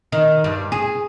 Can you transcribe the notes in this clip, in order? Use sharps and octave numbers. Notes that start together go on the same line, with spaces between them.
D#3
G2
G#4